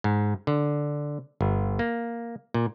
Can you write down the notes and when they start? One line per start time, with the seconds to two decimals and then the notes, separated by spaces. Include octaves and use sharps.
0.04 G#2
0.47 D3
1.41 G1
1.79 A#3
2.54 A#2